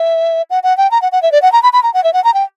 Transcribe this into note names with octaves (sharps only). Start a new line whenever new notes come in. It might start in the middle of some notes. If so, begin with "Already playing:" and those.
Already playing: E5
F#5
F#5
G5
A#5
F#5
F#5
E5
D5
F#5
A#5
B5
B5
A#5
F#5
E5
F#5
A#5
G5